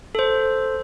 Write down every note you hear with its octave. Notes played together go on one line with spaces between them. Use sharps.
A4 C5